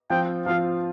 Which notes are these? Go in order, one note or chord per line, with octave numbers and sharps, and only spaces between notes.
F3 C4 F4 G5
F3 C4 F4 F5